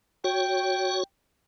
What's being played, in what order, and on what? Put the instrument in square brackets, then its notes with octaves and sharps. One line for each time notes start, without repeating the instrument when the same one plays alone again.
[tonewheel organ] F#4 C#5 [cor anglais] G5